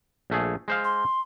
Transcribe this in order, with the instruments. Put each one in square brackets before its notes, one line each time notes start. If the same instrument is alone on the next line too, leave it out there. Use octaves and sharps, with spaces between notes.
[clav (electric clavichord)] A#1 A3 G#4
G#3 C5 F5
[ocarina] C6